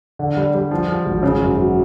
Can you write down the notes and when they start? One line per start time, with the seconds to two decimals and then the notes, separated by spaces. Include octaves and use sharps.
0.19 D3
0.37 G3
0.54 G3
0.71 F3
0.88 F3
1.06 G#1
1.23 C#3
1.41 F#2
1.57 F#3